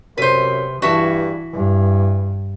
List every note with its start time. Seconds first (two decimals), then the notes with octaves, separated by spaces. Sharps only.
0.18 F#2 C3 B4 C5
0.82 G2 E3 F#4 E5 A5
1.53 G2 E3